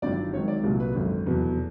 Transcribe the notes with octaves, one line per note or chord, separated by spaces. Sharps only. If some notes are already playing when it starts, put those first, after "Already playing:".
G1 G2 D#3 F#3 D5
G#1 G#2 D#3 F#3 C#5
D5
C2 A#2 F#3
B4
G#1 F#2 D3
F1 E2 B2 F#3 B4